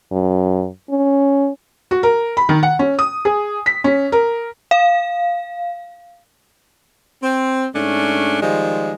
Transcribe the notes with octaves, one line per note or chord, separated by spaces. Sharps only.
F#2
C#4
F#4
A#4
B5
D#3
F#5
C#4
D#6
G#4
B6
C#4
A#4
F5
C4
G#2 A3 C#4 D4
D#3 F3 G3 G#3